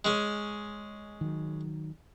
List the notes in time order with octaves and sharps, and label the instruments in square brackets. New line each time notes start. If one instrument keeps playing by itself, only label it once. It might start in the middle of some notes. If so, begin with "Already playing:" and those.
[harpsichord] G#3 C#4
[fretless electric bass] D#3 F#3